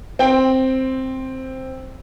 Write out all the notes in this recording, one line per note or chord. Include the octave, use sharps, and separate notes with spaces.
C4 G5